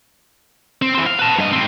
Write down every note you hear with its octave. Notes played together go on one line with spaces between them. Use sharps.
C4
E3 C4
F5
B4 A5
G2 D#5
G#2 C4